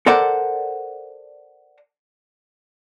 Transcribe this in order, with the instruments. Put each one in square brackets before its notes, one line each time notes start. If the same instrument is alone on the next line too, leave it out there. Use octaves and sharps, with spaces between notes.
[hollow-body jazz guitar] A4 A#4 C5 D5 F#5